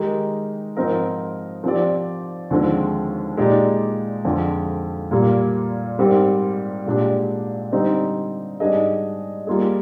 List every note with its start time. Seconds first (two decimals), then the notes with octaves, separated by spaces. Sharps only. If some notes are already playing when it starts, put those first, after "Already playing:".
Already playing: D#3 G#3 D#4 G4 A#4
0.76 G#2 F3 C4 D#4 A#4
1.64 F3 C4 G4 D5
2.50 D#2 D3 F3 G#3 C4
3.37 A#2 G#3 D#4 G4 D5
4.24 F2 D3 F3 G#3
5.11 A#2 G3 A#3 F4
5.99 G#2 G3 C4 G4 A#4
6.86 A#2 G#3 D4 G4
7.72 D3 G3 C4 D#4
8.60 G#2 G3 D4 G#4 D#5
9.47 G3 A#3 F4 G#4